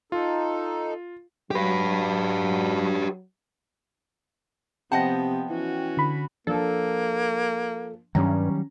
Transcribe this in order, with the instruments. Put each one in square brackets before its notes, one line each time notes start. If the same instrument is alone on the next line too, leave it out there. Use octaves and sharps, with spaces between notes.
[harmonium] D#4 A4 [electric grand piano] F4
[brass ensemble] F#3 [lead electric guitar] G4 B4
[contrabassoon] C3 [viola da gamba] F3 B3 [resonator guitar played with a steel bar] D#5 F#5 A5 [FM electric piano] G5
[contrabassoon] E3 [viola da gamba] C#4 F#4
[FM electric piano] D3 B5
[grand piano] F3 D4 [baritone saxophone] A#3 [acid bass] A4
[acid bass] G2 [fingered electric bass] D#3 F#3 G3 [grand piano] C#4 A#5